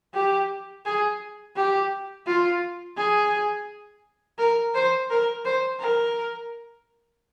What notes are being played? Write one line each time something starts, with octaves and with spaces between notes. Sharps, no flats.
G4
G#4
G4
F4
G#4
A#4
C5
A#4
C5
A#4